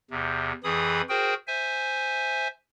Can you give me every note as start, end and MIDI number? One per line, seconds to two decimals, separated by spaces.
0.11 0.52 40
0.11 0.52 48
0.64 1.01 41
0.64 1.01 52
0.64 1.01 68
0.64 1.01 83
0.64 1.01 87
1.09 1.34 66
1.09 1.34 68
1.09 1.34 70
1.09 1.34 72
1.09 1.34 79
1.47 2.48 72
1.47 2.48 76
1.47 2.48 80